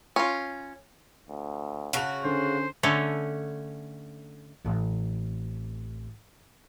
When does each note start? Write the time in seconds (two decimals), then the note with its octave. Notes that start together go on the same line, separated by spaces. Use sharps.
0.16 C#4 F4
1.29 D2
1.93 C#3 F#4 A5 F7
2.24 D3 C#4 C5
2.83 D3 A3 C#4
4.65 A1 C4